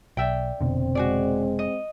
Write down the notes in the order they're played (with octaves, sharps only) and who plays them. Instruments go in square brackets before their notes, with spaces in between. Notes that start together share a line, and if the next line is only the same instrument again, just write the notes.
[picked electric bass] B1 [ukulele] D5 E5 G5
[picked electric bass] F1 B2 D3 [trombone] C4
[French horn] G#3 [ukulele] F#4 G#4 D5
[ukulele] D#5